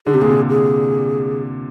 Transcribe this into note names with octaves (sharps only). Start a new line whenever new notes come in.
D3 G#4
C3 G4
A#2 G#4
C3
G#4